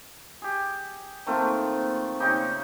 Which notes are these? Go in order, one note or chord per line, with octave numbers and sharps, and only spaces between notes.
G4 G#4
D#3 A3 A#3 C4 F4 C5
C#3 D#4 G4